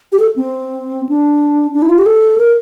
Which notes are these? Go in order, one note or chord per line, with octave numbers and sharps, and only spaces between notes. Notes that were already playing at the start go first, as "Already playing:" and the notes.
G4
A4
C4
D4
D4
E4
F4
G4
A4
A#4